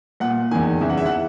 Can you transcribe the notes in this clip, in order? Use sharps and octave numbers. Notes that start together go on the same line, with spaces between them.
A#2 F#5
E2 D#3 G#5
E2 C#3 E3 E5
F#5
E5
F#5